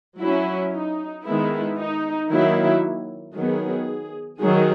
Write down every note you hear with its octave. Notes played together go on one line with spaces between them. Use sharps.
F#3 C#4 E4
D#4
D#3 G#3 B3 E4
D#4
D#3 F#3 A#3 E4
D#3 F#3 B3 G#4
D#3 F#3 G#4